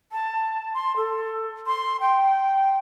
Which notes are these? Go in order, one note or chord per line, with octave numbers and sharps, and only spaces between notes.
A5
C6
A4
C6
G5